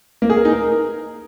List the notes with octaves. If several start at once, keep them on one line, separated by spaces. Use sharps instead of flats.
A#3
G#4
A#4
D#4
A#4